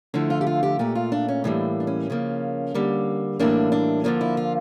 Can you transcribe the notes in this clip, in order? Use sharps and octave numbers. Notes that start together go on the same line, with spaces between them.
D3 F3 A3 E4
F4
G4
F4
G4
A#2 A3 G4
F4
D4
C#4
A2 E3 G3 A#3 D4
D4
C#4
C#3 F3 A#3
D3 G3 A#3
A2 E3 G3 A#3 D4
D4
D3 F3 A#3 D4
E4
F4